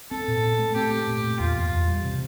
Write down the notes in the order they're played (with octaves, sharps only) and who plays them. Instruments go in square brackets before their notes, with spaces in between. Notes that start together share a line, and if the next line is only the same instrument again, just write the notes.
[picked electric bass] C4 [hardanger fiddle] A4
[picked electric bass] A#2
C4
A3
[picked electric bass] C4 [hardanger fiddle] G4
[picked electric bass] A3
A#2
A#2
[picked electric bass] E2 [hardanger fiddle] F4
[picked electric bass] E2
E2
G3
C3